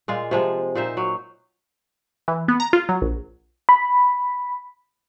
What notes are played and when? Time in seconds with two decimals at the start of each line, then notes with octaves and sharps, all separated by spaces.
0.08 A#2 G#3 F4
0.31 C3 F3 G#3
0.75 A#2 D#4 C5 E5
0.97 F#3
2.28 E3
2.48 B3
2.60 A#5
2.73 F4
2.89 F#3
3.02 A#1
3.69 B5